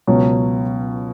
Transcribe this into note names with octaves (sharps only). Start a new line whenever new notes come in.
C#2 B2 F#3 C#4